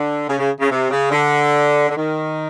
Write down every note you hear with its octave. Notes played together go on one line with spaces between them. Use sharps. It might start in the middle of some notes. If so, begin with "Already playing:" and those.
Already playing: D3
C#3
C#3
C#3
C3
C#3
D3
D3
D#3